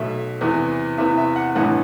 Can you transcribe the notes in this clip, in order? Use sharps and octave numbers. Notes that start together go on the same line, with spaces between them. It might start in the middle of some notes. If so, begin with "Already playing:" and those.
Already playing: B1 B2 A3 E5
E2 C3 E3 B3
E2 C3 E3 B3 E5
E5
F#5
A1 G2 E3 B3 F#5